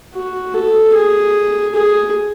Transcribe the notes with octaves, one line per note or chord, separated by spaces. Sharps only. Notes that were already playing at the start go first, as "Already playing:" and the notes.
F#4
A4
G#4
G#4